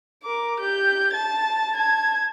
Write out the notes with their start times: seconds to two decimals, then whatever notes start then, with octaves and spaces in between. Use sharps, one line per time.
0.24 A#4 D6
0.60 G4 G6
1.13 A5 A6
1.76 A5 G#6